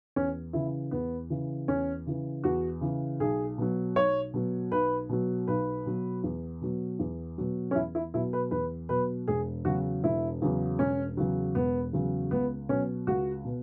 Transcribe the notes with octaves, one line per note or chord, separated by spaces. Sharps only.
E2 C#4
C#3 E3 E4
E2 B3
C#3 E3
E2 C#4
C#3 E3
E2 F#4
C#3 E3
B1 G#4
B2 F#3
B1 C#5
B2 F#3
B1 B4
B2 F#3
B1 B4
B2 F#3
E2
B2 F#3
E2
B2 F#3
C#4
E2 E4
E4
B2 F#3 E4
B4
E2 B4
B2 F#3 B4
E1 G#4
E2 C#3 F#3 F#4
E1 E4
E2 C#3 F#3
E1 C#4
E2 C#3 F#3
E1 B3
E2 C#3 F#3
C#2 B3
B2 F#3 C#4
C#2 F#4
B2